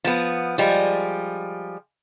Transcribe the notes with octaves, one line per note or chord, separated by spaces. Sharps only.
F3 B3
F3 G3 G#3